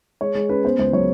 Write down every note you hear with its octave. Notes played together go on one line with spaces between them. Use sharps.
G#3 C#5
G#3
C#4 B4
B3 C5
C#2 C5
F#3 C#5